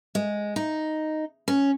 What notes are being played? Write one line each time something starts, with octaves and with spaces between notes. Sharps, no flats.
G#3
D#4
C#4